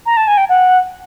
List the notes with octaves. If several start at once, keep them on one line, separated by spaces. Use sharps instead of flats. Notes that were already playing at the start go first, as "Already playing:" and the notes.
A#5
A5
G#5
G5
F#5